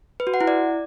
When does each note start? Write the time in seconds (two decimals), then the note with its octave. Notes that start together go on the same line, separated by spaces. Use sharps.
0.20 B4
0.27 F#4
0.34 F#5
0.41 E4
0.47 D5